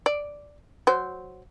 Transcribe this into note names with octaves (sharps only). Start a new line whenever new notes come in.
D5
F#3 C5